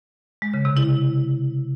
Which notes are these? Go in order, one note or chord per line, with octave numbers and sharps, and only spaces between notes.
G#3
C#3
C3
E4